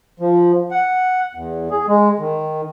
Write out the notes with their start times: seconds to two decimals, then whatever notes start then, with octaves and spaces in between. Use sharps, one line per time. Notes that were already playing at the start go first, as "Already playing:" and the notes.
0.20 F3
0.71 F#5
1.35 E2
1.71 G#4
1.88 G#3
2.19 D#3